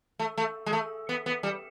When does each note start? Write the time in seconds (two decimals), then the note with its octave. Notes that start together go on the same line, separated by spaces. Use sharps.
0.19 A3
0.38 A3
0.66 G#3
0.73 A3
1.09 B3
1.26 B3
1.43 G3